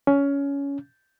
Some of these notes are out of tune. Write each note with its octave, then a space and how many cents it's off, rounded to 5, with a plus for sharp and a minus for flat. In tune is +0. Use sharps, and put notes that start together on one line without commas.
C#4 +20